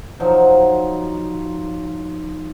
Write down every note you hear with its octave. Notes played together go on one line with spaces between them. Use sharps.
F3 F#3 D#4